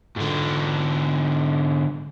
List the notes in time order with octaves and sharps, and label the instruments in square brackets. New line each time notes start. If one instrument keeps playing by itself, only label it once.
[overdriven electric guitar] G#2 D3